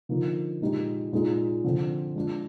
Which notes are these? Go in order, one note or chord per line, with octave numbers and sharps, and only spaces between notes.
D3 F3 A#3 D#4
A#2 G#3 D#4 G4
A#2 G#3 D#4 G#4
D3 F3 C4
G#3 D4 F4